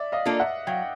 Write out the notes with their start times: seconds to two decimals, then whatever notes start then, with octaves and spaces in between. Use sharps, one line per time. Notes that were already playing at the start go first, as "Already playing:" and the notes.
Already playing: D5 E5
0.12 D#5 F5
0.25 A#3 D4 F4 A4
0.39 E5 F#5
0.67 F#3 F5 G5